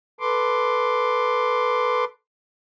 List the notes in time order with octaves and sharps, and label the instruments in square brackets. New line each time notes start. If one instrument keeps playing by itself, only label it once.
[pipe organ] A4 B4 C6 D6